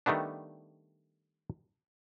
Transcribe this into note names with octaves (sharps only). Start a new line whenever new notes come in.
D#3 G3 A3 B3 D4